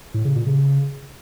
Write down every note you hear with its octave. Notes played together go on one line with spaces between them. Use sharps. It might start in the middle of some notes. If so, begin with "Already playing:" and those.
A2
C#3
A#2
C#3